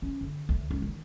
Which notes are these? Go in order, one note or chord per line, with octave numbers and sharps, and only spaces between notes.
C#4
D3
D2
C#2
D#3